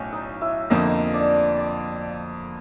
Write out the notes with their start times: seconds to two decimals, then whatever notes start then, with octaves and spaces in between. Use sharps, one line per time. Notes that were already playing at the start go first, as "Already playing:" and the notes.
Already playing: B1 A2 C#4 C#5
0.12 D#4 D#5
0.41 E4 E5
0.70 F2 D3 F3 A#3 D#4 D#5
1.13 D4 D5
1.57 D4 D5